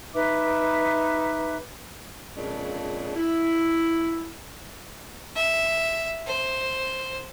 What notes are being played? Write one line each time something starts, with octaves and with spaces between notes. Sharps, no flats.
D#4 B4 E5 D6
F2 A#2 C#3 G#3 D4
E4
E5
C5